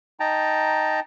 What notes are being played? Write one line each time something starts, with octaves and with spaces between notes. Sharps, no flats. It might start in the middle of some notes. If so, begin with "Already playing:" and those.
D#4 G5 A5 A#5